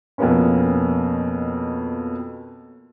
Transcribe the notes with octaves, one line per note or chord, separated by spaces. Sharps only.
F2 B2 A#3 B3 C#4